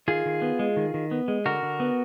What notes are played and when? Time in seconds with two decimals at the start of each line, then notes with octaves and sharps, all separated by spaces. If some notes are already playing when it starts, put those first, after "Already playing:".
0.08 D#3 F4 G#4
0.26 D#3
0.42 B3
0.59 G#3
0.76 D#3
0.94 D#3
1.11 B3
1.28 G#3
1.46 D3 F#4 A#4
1.63 D3
1.80 B3